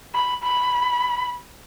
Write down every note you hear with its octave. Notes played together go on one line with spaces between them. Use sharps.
B5
B5